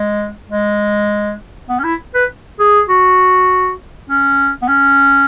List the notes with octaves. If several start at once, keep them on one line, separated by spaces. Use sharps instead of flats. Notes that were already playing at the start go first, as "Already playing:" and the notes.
Already playing: G#3
G#3
B3
C#4
E4
B4
G#4
F#4
C#4
B3
C#4